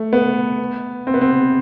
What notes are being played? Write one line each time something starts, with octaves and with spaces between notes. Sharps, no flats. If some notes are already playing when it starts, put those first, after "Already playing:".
Already playing: A3
B3
C4
B3
C4